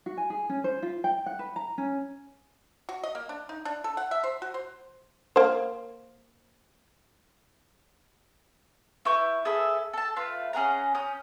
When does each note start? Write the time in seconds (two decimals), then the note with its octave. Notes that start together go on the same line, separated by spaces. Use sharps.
0.06 F#4
0.17 G#5
0.30 G#4
0.49 C#4
0.64 C5
0.82 F4
1.04 G5
1.26 F#5
1.39 B4
1.56 A#5
1.78 C#4
2.89 F#4
3.03 D#5
3.15 A#3
3.29 D4
3.49 D#4
3.65 D4
3.84 A4
3.97 F#5
4.11 E5
4.24 C5
4.42 F#4
4.54 C5
5.36 A#3 C5
9.05 E4 B4 C#6 G6
9.45 G#4 A4 B4 E5
9.93 A4 A5
10.16 A3 F4 B4
10.53 C#4 G#4 F#5 A#5
10.95 C#4 D#6 G6